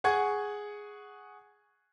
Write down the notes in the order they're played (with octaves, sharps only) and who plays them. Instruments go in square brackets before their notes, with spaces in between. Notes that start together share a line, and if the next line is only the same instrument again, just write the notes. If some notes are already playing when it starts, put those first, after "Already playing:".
[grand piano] G#4 F#5 G#5 C#6 G#6